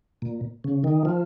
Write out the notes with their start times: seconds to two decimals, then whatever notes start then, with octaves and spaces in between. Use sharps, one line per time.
0.22 A#2
0.64 C#3
0.84 D#3
1.05 F3